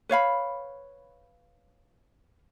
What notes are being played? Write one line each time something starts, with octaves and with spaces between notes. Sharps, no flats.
B4 C#5 F5 B5